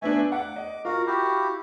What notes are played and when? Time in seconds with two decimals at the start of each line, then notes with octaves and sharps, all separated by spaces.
0.02 A3 B3 D4 E5 G#5
0.32 F#5 D6
0.56 D#5
0.85 F4 F#4 A#4
1.07 E4 F#4 G4